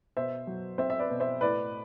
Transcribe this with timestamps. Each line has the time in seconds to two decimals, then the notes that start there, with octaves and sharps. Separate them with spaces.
0.17 B2 C5 E5
0.47 F#3
0.78 C4 C5 E5
0.90 E5
0.99 B4 D5
1.10 B2
1.20 C5 E5
1.41 A2 B4 D5